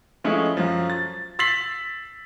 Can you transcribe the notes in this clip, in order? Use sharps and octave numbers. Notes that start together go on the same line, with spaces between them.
F3 G#3 A3 C#4 E4
F#2 F3
A6
E6 A6 B6 C7 F#7